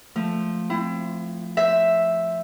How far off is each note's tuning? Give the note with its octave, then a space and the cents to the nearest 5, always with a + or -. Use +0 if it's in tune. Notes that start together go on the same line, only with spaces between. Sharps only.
F3 +5 A3 +0
C4 +0 E4 +25
C5 +0 E5 +0